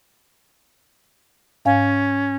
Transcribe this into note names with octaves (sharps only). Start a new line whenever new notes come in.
G#2 C#4 F5 G#5